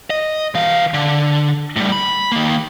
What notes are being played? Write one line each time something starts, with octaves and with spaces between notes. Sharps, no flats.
D#5
E3 F5
D3
A2 G3
B5
D#3 A#3